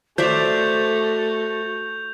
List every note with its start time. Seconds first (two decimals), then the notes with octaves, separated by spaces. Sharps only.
0.18 A3 F#4 C5 D5 E5 G6 F7